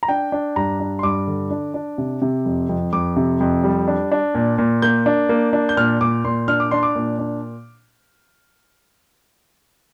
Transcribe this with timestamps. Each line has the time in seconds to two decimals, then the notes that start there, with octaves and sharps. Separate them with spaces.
0.03 A#5
0.08 D4 G5
0.32 D4
0.56 G2 A#5
0.80 D4
0.99 C6
1.03 G2 D6
1.27 D3
1.51 D4
1.74 D4
1.98 C3
2.22 C3
2.46 F2
2.69 F2
2.93 F2 D6
3.16 C3
3.40 F2
3.64 G3
3.88 D4
4.12 D4
4.35 A#2
4.58 A#2
4.82 A#3 G6
5.06 D4
5.29 A#3
5.53 D4
5.69 G6
5.77 A#2 F6
6.01 A#2 D6
6.25 A#2 C6
6.48 D4 F6
6.60 D6
6.71 D4 C6
6.83 D6
6.95 A#2
7.19 D4